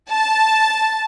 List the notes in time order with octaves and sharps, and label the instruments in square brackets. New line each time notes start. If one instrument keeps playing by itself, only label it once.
[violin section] A5